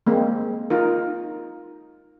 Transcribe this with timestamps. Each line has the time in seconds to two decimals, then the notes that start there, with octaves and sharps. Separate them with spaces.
0.06 G#3 A#3 C4
0.70 D#4 F4 A#4